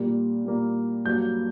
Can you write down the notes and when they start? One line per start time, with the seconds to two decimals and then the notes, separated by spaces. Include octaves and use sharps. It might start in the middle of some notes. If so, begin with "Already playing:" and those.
Already playing: A#2 G3 A#3
0.45 A#2 G3 A#3
1.05 G2 F#3 A#3 G6